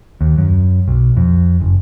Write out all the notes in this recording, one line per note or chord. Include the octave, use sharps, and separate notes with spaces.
D#2
F#2
B1
F2
F#1